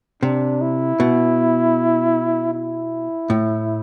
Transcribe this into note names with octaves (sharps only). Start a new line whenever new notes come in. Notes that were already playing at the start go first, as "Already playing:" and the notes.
C3 D4
E4
B2
E4
A2